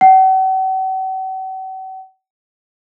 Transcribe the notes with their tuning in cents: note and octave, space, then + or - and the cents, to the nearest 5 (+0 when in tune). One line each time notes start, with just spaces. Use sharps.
F#5 +45